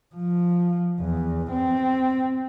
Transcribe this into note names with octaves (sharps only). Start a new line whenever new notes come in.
F3
E2
C4